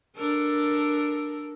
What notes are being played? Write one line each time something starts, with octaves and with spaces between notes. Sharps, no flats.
D4 A4 A#4